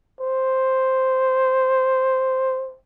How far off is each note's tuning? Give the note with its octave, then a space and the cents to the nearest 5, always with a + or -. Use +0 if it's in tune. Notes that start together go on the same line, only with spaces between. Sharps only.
C5 +0